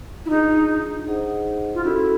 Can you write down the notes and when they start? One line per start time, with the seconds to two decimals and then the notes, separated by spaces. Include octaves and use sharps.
0.25 E4
0.30 D4 D#4 F4 G#4
1.07 D#4 G#4 C5 D#5 F#5
1.74 F4
1.84 C#4 E4 F#4 A4